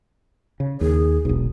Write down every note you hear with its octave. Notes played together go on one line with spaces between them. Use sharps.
C#3
D#2 G#4
E1 B1